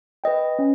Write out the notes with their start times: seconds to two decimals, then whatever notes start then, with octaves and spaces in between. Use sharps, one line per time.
0.24 B4 D#5 G5
0.59 C#4